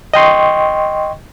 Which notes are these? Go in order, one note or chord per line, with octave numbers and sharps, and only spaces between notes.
D#5 G5 C6 C#6